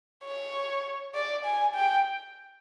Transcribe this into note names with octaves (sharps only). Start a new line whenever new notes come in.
C#5
D5
G#5
G5